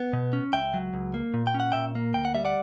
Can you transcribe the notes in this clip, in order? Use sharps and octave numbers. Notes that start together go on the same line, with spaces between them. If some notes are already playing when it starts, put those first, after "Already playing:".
Already playing: B3
B2
C#4
C#2 E5 G5
F#3
C#2
A#3
A#2
G5
C#4
F#5
A#2 E5 G5
A#3
D2 G5
F#5
G3 E5
D5 F#5